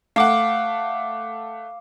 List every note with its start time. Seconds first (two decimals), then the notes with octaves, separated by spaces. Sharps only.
0.16 A3 F5 F#5 D6